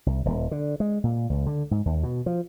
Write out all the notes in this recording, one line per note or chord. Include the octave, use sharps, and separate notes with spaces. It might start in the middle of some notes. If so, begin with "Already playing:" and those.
C2
D#1
D3
G#3
A#2
C#2
D3
G#2
D#2
B2
F3